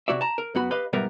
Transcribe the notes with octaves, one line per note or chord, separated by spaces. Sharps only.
C3 F#3 F#4 D5 E5
A5 A#5
A#4
F#2 B3 F#4 B5
G4 B4 D#5 F5 B5
B1 G#2 G3 B3 A#4 E5